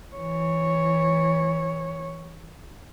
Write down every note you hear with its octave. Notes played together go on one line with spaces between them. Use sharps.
E3 C#5